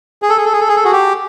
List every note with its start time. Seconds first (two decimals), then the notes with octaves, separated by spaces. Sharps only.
0.22 G#4
0.29 A4
0.37 G#4
0.45 A4
0.53 G#4
0.61 A4
0.68 G#4
0.76 A4
0.84 F#4 G#4
0.92 G4